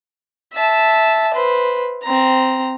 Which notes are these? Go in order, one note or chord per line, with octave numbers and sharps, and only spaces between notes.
E5 A5
B4 C5
C4 A#5